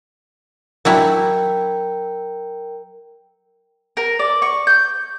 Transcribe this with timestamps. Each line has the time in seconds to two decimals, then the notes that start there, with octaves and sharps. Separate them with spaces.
0.85 F#3 D4 E4 A#4 G5
3.97 A#4
4.19 D5
4.42 C#6
4.67 G6